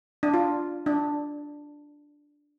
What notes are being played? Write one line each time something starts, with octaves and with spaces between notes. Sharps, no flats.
D4
F4
D4